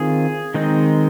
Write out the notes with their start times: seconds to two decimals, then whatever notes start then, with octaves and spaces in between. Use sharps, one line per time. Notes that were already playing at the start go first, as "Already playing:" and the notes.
Already playing: D#3 C4 F4 G#4
0.54 D#3 G#3 C4 D#4